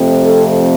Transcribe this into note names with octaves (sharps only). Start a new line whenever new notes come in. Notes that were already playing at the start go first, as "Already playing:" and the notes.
Already playing: F2 C3 F3 A3 C4
A4